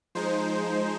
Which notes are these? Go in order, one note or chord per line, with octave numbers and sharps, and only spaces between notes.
F3 G#3 D#4 C5